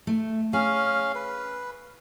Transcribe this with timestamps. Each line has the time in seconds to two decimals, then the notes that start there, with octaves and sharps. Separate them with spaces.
0.07 A3
0.53 C#4 G#4 F5
1.15 B4